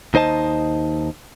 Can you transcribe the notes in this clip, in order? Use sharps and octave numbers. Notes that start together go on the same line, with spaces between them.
D#2 D#4 C5 D#5 A5